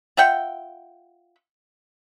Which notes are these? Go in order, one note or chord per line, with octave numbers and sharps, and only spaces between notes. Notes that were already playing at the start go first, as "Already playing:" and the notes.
F4 E5 F#5 G5